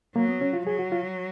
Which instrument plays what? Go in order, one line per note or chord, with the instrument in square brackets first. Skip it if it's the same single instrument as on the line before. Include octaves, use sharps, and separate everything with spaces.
[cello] F#3 [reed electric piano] A#3
[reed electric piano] B3
C#4
F4
[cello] F#3 [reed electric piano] G#4
[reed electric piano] F#4
F4